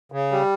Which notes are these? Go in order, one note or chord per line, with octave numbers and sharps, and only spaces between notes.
C#3
G3